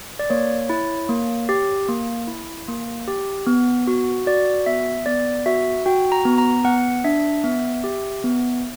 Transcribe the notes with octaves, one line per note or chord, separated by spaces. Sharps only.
D5
A#3 C#5
E4
A#3
G4
A#3
E4
A#3
G4
B3
F#4
F#4 D5
B3 E5
B3 D5
F#4 E5
F#4 G5
A#5
B3
A#5
B3 F#5
D4 E5
B3 E5
G4
B3